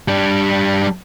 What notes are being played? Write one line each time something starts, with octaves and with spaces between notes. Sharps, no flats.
G3 D4